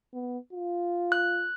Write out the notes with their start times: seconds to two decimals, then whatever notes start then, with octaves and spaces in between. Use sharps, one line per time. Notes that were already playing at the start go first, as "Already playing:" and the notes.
0.14 B3
0.53 F4
1.12 F#6